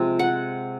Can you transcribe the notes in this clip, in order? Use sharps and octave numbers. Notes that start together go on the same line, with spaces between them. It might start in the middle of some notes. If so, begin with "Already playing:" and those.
Already playing: C3 F3 G#3
F#5